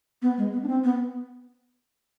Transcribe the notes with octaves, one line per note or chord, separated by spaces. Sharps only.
B3
G#3
B3
D4
C4
B3